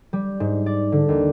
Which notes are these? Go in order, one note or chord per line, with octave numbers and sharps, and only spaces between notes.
G3
G#2
D5
D3
D#2